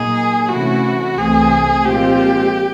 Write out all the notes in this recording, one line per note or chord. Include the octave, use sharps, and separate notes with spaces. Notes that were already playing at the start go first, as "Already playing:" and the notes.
Already playing: A#2 F#3 A#3 D#4 G#4
C3 E3 A3 C#4 E4 F#4
C2 C3 E3 A3 C4 G#4
A#2 F3 G#3 C4 F4 G4